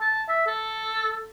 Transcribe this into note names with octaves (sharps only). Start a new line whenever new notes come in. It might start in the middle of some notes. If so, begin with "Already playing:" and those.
A5
E5
A4